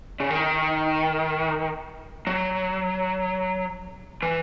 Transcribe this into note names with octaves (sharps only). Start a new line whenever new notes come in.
C#3
D#3
F#3
E3